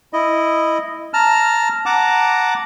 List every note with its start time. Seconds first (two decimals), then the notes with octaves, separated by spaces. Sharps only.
0.13 E4 D#5
1.14 A5 A#5 F6
1.86 F#5 A5 A#5 D6